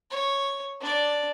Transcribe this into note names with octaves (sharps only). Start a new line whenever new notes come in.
C#5
D4 D5